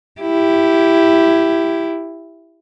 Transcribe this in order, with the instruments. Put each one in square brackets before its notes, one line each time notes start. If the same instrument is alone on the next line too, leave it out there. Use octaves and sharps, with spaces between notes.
[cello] E4 G4